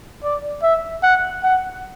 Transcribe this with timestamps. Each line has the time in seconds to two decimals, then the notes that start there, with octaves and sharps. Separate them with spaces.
0.23 D5
0.63 E5
1.03 F#5
1.43 F#5